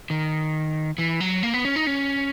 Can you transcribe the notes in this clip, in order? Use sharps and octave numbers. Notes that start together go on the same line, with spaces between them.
D#3
E3
F#3
A#3
B3
C#4
D#4
C#4